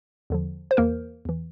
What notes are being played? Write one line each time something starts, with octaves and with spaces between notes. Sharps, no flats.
E2 D3 F3
C5
E2 E3 A#3 A#4
E2 E3